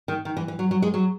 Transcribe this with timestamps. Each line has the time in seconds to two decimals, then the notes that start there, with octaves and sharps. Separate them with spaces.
0.08 D#3
0.25 D#3
0.37 E3
0.48 E3
0.59 F#3
0.71 F#3
0.82 G#3
0.94 F#3